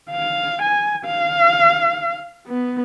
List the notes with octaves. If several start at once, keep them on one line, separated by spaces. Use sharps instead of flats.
F5
G#5
F5
B3